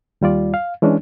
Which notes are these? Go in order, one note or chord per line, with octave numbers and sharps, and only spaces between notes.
D#2 G3 F4 D5
F5
E3 G#3 C#4 D4